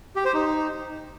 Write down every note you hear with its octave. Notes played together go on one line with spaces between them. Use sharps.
G4
C5
D#4